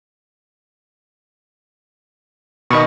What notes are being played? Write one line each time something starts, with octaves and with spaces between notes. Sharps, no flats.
B2 D#3 D#5 B5 C#6